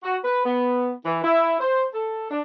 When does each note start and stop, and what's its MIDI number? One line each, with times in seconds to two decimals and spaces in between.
0.02 0.17 66
0.24 0.42 71
0.45 0.91 59
1.05 1.19 52
1.23 1.54 64
1.59 1.85 72
1.93 2.26 69
2.31 2.40 62